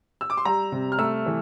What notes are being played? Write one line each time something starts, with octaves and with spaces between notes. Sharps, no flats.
E6
D6
C6
G3 A#5
C3
F6
A3 E6
E3